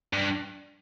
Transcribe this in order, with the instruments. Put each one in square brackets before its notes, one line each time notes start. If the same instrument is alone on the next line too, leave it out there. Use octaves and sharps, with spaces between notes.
[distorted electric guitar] G2